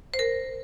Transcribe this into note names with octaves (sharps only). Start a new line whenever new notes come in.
C5
A#4